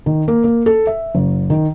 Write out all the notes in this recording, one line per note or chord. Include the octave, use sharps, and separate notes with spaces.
D#3
A#3
A#3
A4
E5
F#1
D#3